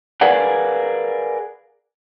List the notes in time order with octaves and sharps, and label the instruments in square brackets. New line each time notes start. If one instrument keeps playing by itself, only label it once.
[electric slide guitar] G#4 A#4 B4 D5 F5 F#5